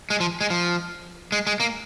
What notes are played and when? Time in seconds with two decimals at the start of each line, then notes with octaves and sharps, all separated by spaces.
0.10 G#3
0.20 F3
0.41 G#3
0.50 F3
1.32 G#3
1.47 G#3
1.60 A#3